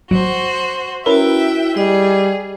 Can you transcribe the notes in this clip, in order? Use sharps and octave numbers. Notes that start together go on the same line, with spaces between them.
G#1 F#3 F#4 C5
C#4 E4 F#4 A#4 B4 E5 G5
G3 G#4 D#5